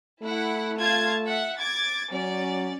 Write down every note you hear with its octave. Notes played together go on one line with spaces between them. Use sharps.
A3 E4 F#5
F4 A5 G#6
E5 F#5
D6 G#6 A6
F#3 C#4 D5